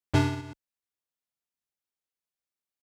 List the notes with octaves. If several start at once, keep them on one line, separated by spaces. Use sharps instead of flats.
F#2 C3 D4